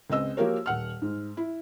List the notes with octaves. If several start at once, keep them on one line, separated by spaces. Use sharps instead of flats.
C#2 C4 D#5 E6
F3 A#3 F#4 G4 A#4 C#5
D#1 F#5 F6
G#2
E4